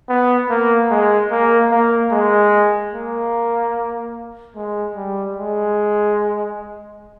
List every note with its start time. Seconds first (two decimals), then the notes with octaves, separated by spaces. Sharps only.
0.09 B3
0.49 A#3
0.90 G#3
1.31 A#3
1.71 A#3
2.11 G#3
2.93 A#3
4.56 G#3
4.95 G3
5.37 G#3